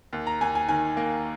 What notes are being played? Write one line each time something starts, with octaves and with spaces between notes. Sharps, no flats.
D#2
A#5
D#2 G#5
G#5
D#3 G#5
A#3